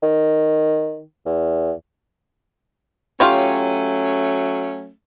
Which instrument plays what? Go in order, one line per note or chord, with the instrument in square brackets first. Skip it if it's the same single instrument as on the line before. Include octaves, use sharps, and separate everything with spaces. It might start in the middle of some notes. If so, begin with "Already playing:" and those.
[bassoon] D#3
E2
[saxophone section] F#3 A3 C#4 [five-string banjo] F4 G4 C#5